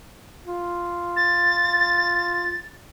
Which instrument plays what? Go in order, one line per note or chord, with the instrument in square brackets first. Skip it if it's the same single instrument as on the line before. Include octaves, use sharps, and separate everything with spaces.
[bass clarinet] F4
[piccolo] A6